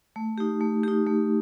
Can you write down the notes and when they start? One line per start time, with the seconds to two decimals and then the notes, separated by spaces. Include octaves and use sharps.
0.16 A3
0.38 D#4 G4
0.61 A3
0.84 D#4 G4
1.07 A3